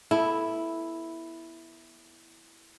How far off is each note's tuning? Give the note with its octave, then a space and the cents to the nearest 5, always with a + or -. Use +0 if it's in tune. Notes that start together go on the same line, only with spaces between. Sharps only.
B3 -20 E4 +0 A4 -10